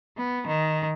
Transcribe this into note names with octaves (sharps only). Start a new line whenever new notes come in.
B3
D#3